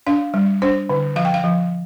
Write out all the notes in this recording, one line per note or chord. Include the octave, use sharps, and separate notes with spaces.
D4 F5
G3
D4 C5
D3
F3 F5
G5
F5
F3